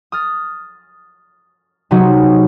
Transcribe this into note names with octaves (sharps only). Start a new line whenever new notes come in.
D#6 F6 A6
C3 F#3 D#4 F#4 G#4